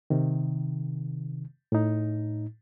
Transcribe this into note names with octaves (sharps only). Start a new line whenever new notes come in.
C3 D#3
A2 D#4